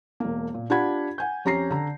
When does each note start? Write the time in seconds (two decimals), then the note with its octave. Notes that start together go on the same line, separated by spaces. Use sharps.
0.20 E1 A#3
0.54 A#2
0.70 D4 F4 G4 F#5 B5 G#6
1.18 F#5 G#5 G6
1.45 F2 C#4 G4 A#5 A#6 C7
1.70 D3 A#5